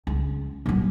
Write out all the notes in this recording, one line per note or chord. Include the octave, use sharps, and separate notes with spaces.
C#2
D#1 F#3